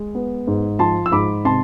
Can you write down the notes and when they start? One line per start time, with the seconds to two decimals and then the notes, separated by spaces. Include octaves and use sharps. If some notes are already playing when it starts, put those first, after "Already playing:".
Already playing: G#3
0.15 B3
0.47 G#2
0.79 F3 A5 C6
1.06 E6
1.12 G#2 B5 D6
1.45 C3 A5 C6